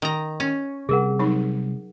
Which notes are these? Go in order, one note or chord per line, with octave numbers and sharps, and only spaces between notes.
D#3 A#5
C#4
C3 G3 G#4 A#4 F#5
F#3 D#4